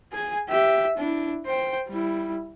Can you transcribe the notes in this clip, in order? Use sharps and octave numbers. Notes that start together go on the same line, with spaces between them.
G#4 G#5
G4 E5
D4 E4
C5 G5
G3 E4